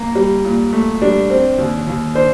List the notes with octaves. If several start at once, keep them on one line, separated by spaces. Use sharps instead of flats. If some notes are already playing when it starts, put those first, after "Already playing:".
Already playing: A#3
G3
A#2
A3
G3 D4
C4
D#2
D#2
D4 C5